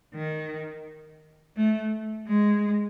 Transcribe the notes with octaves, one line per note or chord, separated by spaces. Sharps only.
D#3
A3
G#3